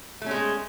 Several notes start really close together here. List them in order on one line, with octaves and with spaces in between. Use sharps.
A3 C#4 G#3